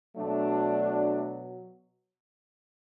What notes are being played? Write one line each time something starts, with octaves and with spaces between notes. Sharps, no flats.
B2 F#3 A3 D4